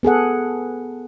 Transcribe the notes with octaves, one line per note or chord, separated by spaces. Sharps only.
B3 G#4 A4 F#5